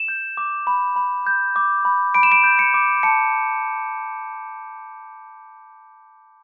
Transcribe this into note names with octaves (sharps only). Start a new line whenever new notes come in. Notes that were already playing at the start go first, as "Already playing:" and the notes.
Already playing: E7
G6
D6
B5
B5
G6
D6
B5
B5 D7
E7
D7
G6
C#7
D6
A5 C#7